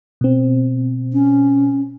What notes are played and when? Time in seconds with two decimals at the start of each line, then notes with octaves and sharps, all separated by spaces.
0.21 B2 C4
1.13 C#4